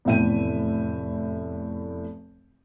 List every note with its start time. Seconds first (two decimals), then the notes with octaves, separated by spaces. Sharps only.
0.05 F1 E2 A2 E5 G5 D#7